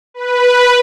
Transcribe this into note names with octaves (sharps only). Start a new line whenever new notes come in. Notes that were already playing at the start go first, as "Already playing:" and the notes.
B4